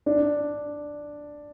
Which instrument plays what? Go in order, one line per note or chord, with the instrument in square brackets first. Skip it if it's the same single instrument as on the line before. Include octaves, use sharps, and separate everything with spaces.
[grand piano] D4